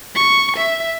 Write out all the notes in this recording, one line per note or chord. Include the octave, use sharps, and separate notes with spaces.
C#6
E5